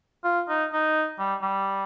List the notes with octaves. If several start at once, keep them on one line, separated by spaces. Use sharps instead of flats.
F4
D#4
D#4
G3
G3